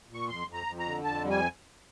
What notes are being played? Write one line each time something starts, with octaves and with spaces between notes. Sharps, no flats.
A#2
C#6
F2 C6
F2
A#5
F2
A#5
D3
F2 A5
G3
G#5